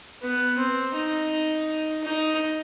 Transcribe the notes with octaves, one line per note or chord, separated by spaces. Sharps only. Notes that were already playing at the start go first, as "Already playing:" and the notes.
B3
C4
D#4
D#4